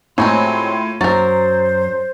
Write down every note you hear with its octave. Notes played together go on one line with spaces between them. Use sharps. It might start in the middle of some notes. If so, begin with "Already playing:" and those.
A2 F#3 G#3 C4 F4 A4 C#5 C6
F#2 F#3 A#4 C5 A6